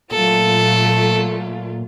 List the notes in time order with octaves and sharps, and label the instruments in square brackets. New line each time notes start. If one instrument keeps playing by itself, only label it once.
[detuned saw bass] A#2 [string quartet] F#3 A3 F4 [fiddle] A4